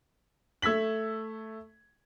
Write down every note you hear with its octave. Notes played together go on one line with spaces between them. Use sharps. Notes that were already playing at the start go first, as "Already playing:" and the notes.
A3 E6 G#6 B6 F#7